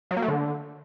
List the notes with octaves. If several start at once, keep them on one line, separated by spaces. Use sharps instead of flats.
F#3
A#3
A3
D3